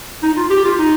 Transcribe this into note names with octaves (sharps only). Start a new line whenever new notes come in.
D#4
F4
G4
F4
D#4